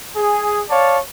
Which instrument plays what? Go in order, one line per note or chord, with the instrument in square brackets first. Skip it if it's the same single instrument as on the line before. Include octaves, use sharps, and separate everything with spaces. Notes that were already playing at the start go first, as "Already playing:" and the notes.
[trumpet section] G#4
C#5 D5 F5 A5